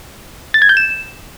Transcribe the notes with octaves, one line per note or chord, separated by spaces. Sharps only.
A6
G#6
G6
E7